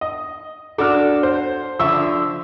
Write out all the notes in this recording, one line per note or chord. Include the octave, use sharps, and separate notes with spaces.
D#5
D4 F#4 A4 D6 F6
C5
D3 F3 E5 C#6 E6